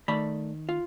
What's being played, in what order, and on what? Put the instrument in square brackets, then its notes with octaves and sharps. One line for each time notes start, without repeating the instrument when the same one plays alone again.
[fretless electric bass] D#3 [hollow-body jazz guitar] A3 D5 B5
[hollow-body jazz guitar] F4